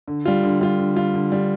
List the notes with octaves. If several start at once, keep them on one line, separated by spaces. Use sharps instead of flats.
D3
G3 F4
D3
G3 F4
D3
G3 F4
D3
G3 F4